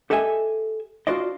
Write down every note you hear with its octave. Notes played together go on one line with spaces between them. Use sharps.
G4 A4 D#5 E5 G#5
D4 F4 F#4 C5 D5 D#5